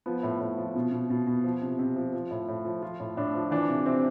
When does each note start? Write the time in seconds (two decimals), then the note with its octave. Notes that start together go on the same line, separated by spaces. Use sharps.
0.06 F3 B3
0.23 A2
0.40 A2
0.57 F3
0.75 B2
0.92 B2
1.10 B2
1.27 B2
1.44 F3
1.62 C3
1.79 C3
1.96 F3
2.14 F3
2.31 A2
2.48 A2
2.65 F3
2.82 F3 F4
3.00 A2
3.17 A2 D4
3.34 F3
3.51 E3 D4
3.69 C3
3.86 C3 C4